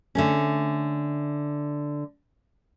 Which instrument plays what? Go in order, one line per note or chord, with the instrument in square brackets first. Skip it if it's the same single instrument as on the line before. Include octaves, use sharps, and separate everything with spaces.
[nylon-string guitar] D3 A3 C#4